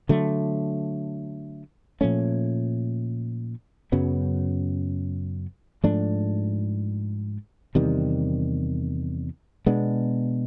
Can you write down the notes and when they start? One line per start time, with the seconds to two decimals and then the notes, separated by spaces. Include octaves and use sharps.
0.09 D3 F#3 A3
2.01 A#2 F3 A3 C#4
3.92 F#2 C#3 F#3 B3
5.84 G#2 F3 A3 D4
7.75 E2 C3 D#3 G3
9.66 B2 G#3 B3 D4